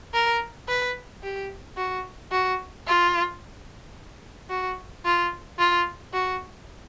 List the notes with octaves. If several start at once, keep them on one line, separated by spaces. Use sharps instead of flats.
A#4
B4
G4
F#4
F#4
F4
F#4
F4
F4
F#4